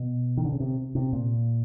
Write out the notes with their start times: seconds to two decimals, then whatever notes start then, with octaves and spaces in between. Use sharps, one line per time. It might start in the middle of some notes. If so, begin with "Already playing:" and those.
Already playing: B2
0.37 D#3
0.45 D3
0.52 C#3
0.60 C3
0.95 C3
1.13 A#2